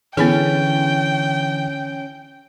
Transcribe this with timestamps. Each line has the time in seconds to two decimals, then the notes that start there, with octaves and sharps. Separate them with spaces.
0.17 D3 E3 B3 C#4 E4 G#4 G5